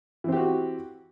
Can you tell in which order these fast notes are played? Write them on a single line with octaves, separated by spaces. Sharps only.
E3 C4 G4 F#4